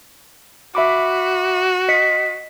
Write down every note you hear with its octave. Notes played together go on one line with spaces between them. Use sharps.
F#4 E5 B5 D6
D#5 B6 C#7